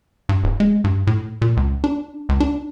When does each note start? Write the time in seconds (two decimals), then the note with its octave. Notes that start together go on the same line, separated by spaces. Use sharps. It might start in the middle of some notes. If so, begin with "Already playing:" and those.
0.29 G2
0.44 D1
0.60 G#3
0.84 G2
1.07 A2
1.42 A#2
1.57 C#2
1.84 D4
2.29 C#2
2.40 D4